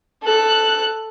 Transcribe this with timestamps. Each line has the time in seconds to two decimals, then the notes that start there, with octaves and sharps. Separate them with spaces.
0.23 A4 F#6